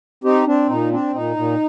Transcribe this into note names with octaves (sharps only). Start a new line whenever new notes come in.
C4 D#4 G4
C4 D4
A#2 D#4
C4 D4
A#2 D#4
A#2